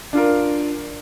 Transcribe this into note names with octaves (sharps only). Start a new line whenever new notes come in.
D4 F4 A#4